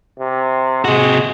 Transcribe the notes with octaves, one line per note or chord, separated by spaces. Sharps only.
C3
C3 G#3 F#4